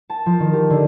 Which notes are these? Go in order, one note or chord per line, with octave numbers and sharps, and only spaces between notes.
A5
F3
D#3
G4
D3